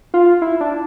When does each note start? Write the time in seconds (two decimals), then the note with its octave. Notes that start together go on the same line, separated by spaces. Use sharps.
0.14 F4
0.42 E4
0.61 D4